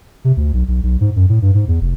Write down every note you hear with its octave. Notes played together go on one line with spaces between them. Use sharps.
C3
D2
B1
B1
B1
G#2
F#2
A2
G2
G#2
E2
F1